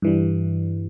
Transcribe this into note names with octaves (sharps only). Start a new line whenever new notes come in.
G2 E3 G3